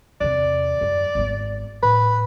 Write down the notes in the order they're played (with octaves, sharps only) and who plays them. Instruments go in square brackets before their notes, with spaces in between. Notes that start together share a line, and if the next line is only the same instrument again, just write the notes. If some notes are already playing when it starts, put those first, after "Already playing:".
[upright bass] E2 C3 [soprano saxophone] D5
[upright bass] F#2
G#1 B3
[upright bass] A2 [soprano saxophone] B4